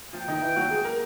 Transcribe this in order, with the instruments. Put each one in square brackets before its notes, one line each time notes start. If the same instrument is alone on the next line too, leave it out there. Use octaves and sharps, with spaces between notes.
[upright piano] F3 F4 [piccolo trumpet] G5
[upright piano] D#3 D#4
E3 E4
F#3 F#4
G#3 G#4
A#3 A#4